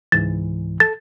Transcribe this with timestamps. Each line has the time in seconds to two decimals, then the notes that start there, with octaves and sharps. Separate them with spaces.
0.12 C#2 G#2 E3 A6
0.80 A4 A6